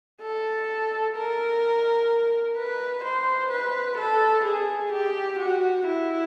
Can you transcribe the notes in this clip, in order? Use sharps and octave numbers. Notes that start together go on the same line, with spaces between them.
A4
A#4
B4
C5
B4
A4
G#4
G4
F#4
E4